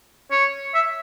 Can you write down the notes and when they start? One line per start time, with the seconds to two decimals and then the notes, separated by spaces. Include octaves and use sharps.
0.31 C#5
0.74 E5